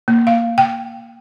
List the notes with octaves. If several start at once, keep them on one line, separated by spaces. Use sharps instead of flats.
A#3
F5
G5